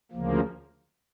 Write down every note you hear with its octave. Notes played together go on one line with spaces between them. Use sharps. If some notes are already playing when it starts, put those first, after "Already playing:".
D2 C#3 F3 A#3